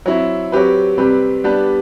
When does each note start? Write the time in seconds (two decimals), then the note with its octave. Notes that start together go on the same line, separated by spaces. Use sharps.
0.06 F#3 C4 E4
0.52 F#3 C4 G4 B4
0.98 C3 G3 C4 G4 B4
1.44 G3 B3 D4 G4 B4